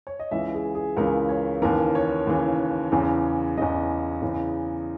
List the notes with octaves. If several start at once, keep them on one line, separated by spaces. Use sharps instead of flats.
C#5
D#5
C#2 C#3 E3 E5
G#4
G#4
C#2 C#3 E3 A#4
C#5
D#2 C#3 E3 A#4
C#5
D#2 C#3 E3
E2 C#3 E3
E2 C#3 E3 D#5
E2 C#3 E3